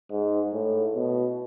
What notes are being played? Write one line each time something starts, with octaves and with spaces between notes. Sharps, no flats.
G#2
A2
B2